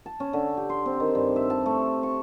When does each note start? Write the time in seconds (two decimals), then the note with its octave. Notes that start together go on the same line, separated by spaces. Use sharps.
0.06 A5
0.20 C#4
0.33 D3
0.57 G4
0.69 C6
0.86 C4
1.00 D#3
1.15 G2
1.36 E5
1.50 A5
1.66 A3
2.03 C#6